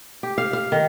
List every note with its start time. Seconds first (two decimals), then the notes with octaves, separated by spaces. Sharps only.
0.23 G4
0.38 F5
0.53 F5
0.72 D#3